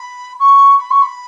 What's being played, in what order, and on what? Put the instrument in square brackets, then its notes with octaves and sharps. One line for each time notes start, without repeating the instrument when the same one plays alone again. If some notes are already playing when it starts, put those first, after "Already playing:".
Already playing: [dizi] B5
C#6
B5
C#6
B5